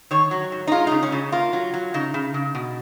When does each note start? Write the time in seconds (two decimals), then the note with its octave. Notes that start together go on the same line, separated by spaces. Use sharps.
0.11 D#3 C#5
0.31 F#3
0.52 G#2
0.67 D#4
0.71 G#3 F4
0.87 C#3 D#4
1.03 C#4
1.12 C#3
1.32 A#3 F4
1.53 F#3
1.74 F#3
1.94 C#3 D#4
2.14 C#3
2.34 C#3
2.55 B2